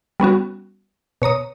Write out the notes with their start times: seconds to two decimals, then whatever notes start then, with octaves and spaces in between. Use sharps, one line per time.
0.20 G3 B3 C#4 F#4
1.22 B2 C#5 A#5 D#6